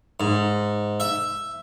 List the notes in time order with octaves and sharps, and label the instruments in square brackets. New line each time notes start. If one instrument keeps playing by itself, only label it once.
[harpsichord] G#2
E5